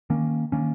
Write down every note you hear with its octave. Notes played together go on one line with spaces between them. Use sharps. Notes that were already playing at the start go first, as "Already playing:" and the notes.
D#3 A#3 C#4
D#3 A#3 C#4